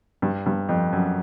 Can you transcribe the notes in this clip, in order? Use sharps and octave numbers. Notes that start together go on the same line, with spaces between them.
G2
G2
F2
F#2